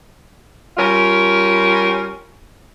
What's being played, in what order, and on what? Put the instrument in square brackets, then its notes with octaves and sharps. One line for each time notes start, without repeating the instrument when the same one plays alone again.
[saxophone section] G3 C#4 F4 A#4